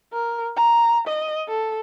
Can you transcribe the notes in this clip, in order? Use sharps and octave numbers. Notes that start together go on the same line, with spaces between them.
A#4
A#5
D#5
A4